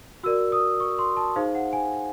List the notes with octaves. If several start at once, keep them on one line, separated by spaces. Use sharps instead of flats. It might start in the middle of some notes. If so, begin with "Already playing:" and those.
F#4 A#4 D5 E6
D#6
C#6
C6
A5
D#4 G#4 C5 F5
F#5
G#5